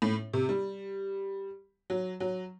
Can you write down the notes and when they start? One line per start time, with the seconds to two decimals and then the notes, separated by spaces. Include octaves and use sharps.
0.02 A2
0.33 C3
0.49 G3
1.90 F#3
2.20 F#3